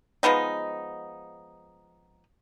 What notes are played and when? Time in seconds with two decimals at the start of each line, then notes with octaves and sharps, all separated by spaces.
0.23 F3 G#3 B3 D#4